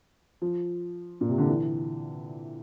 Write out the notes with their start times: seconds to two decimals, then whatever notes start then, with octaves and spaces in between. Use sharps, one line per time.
0.42 F3
1.21 A#2
1.29 C3
1.38 D3
1.47 E3